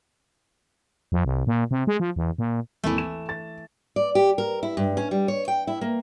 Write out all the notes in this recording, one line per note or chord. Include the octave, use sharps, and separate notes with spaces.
F2
C2
A#2
C3
G#3
F3
E2
A#2
G#1 D#2 E3 A3 E4
E7
A6
D5
G4
A#4
E4
G2
C#4
G3
C#5
G5
E4
A#3